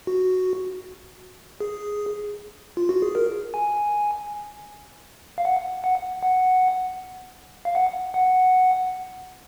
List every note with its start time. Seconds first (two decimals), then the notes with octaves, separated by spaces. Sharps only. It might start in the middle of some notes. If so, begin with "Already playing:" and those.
0.07 F#4
1.61 G#4
2.77 F4
2.89 F#4
3.02 G#4
3.15 A#4
3.54 G#5
5.38 F5
5.45 F#5
5.84 F#5
6.23 F#5
7.65 F5
7.75 F#5
8.14 F#5